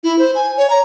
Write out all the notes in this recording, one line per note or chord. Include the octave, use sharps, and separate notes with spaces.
E4
C5
G#5
C#5
A#5